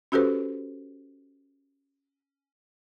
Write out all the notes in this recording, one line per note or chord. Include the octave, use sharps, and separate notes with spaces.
C#4 F#4 G4 A4 B4 C5